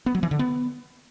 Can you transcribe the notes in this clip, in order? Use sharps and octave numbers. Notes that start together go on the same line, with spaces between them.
B3
F#3
E3
D3
B3